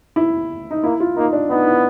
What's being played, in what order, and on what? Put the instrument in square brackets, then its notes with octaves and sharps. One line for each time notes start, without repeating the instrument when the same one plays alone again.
[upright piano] E4
D#4
[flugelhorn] A#3 [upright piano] E4
[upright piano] F4
[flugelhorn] A#3 [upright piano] D#4
[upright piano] D4
[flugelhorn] B3 [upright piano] D#4
[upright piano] E4